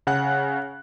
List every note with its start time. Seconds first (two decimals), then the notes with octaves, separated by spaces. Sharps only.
0.07 C#3 F#5 F#6